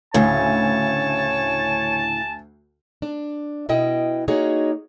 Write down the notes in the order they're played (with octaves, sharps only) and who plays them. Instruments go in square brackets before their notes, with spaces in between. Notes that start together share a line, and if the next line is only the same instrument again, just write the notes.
[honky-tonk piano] D2 [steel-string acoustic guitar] A2 C#3 [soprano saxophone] C#5 [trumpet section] G#5 A5
[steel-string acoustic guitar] D4
B2 B3 E4 D#5 G5
A#3 D#4 F#4 G#4 C#5 D#5